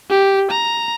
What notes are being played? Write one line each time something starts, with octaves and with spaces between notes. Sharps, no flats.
G4
A#5